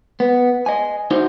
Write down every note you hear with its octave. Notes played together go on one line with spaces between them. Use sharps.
B3
D#5 G#5
D#4 E4 F#4 C5